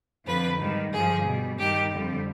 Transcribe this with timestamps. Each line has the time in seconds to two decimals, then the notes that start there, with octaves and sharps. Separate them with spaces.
0.26 F2 D3 F3 B4
0.59 G#2 D#3 G3
0.92 G2 D3 F3 G#4
1.25 B2 G3
1.58 G2 D#3 G3 G4
1.92 F2 D3 G3